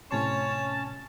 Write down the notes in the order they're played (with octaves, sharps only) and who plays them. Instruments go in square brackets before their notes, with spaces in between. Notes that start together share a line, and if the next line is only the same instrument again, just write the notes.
[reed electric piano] A2 C3 C6 [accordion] C#4 [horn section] C#5 [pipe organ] A5